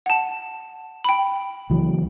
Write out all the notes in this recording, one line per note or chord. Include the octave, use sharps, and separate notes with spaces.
F#5 A5
G5 B5
C#2 E3 F#3